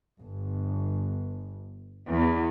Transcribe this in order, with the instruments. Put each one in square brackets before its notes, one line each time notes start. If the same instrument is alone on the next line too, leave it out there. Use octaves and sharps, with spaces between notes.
[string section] G1
E2